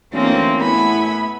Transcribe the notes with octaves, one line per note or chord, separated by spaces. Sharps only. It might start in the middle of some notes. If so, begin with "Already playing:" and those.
D2 E3 A#3 C4 C#4
A2 B3 E4 G#5 B5